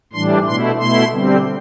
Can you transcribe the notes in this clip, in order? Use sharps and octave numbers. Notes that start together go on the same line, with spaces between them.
A2 E3 G3 D4 C6
B2 A3 E4 C6
B2 A3 E4 C6
D3 G3 C4